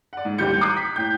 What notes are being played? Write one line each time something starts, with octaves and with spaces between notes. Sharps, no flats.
D5 F#5
G#2
A1 D#2 G3 G4 G6 C#7
A#5 D6 D#6 F#6 G#6 C7
B6
A2 G5 G6